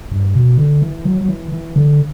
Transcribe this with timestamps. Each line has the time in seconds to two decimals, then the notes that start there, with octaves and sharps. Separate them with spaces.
0.11 G2
0.35 B2
0.58 D3
0.82 E3
1.05 F#3
1.20 F#3
1.29 E3
1.52 E3
1.76 D3